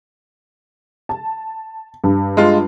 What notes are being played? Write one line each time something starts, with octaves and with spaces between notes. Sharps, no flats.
A5
G2
G#3 F4